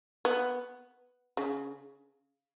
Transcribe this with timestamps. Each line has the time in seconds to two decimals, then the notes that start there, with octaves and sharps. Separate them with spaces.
0.25 B3
1.37 C#3